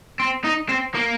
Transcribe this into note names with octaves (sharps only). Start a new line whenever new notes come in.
C4
D#4
C4
A#3